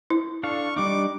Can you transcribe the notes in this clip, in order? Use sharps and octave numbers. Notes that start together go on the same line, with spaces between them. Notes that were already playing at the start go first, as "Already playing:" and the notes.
E4
D4 A4 F5 C#6
G3 D4 D#4 D6